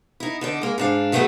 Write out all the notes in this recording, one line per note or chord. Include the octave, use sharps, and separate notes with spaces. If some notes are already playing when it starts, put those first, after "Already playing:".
D#4 E4
D3 D#4 D5
G#3 A#3
G#2 D4 F5
D#3 F#3 A3 B3 G#4